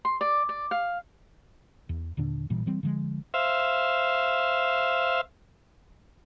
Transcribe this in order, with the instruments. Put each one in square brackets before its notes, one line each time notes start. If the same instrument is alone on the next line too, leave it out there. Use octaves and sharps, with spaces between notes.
[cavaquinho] C6
D5
D5
F5
[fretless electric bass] E2
D#2 A#2 D3 D4
A1 A#2 E3 G3
E3 G3 C4
D3 F3 G3 G#3
[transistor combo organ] C5 E5 F5